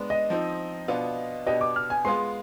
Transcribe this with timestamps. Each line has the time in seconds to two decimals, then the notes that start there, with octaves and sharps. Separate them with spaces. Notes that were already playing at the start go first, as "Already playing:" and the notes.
Already playing: G#3 B3 D4
0.10 D#5
0.30 F3 C4 D#4
0.88 B2 B3 D4 F4
1.47 B2 B3 D4 G4 D#5
1.61 D6
1.76 F6
1.90 G#5
2.05 G#3 B3 F4 G#4 C6